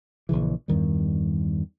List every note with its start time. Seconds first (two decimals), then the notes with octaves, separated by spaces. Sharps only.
0.29 A#1 D#2 C#3 E3
0.68 E2 G2 D#3 G3